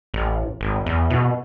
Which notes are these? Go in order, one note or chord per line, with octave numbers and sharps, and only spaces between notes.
A1
G#1
E2
B2